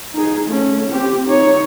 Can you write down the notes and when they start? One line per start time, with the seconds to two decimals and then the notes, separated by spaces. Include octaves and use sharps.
0.15 D#4 G#4
0.47 A3 C#4
0.89 C4 G4
1.27 D#4 C#5